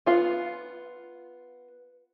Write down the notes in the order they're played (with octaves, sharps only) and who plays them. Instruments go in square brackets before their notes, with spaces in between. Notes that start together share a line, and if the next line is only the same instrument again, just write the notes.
[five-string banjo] B3 F4